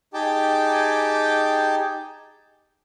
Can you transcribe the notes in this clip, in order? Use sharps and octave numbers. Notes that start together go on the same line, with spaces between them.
D#4 G4 G#4 G5 A5 D6